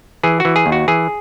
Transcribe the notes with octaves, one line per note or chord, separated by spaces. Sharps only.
E3 G#4
E3 F#4
G#4
D#2
F#4
E3 G#4